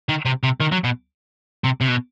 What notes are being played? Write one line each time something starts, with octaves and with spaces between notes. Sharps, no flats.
D#3
C3
C3
D#3
F#3
B2
C3
C3
B2